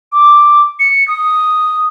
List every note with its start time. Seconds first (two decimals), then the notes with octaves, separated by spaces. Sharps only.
0.12 D6
0.79 C#7
1.08 D#6